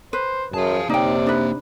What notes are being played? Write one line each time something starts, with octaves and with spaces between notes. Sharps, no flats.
B4 C5
F#2 G#4 F5 A5
C3 A#3 D#4 C#5 D5 G5
D4 D#4 B4